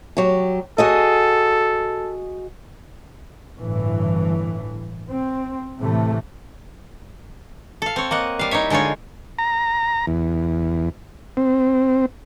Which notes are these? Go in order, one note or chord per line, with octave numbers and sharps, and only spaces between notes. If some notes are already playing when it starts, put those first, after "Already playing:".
F#3 G4
F#4 G#4 A4 D#5
G1 A2 E3
C4
A2 C3 E3 A3
A4 F5
C4 C#5
A#3 D#5 F#5
G3 F5
D#4 E4 C#5 E5
D3 G#3 D#4 F4 C#5
A#5
E2
C4